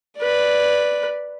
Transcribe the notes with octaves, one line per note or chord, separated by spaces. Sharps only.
B4 D5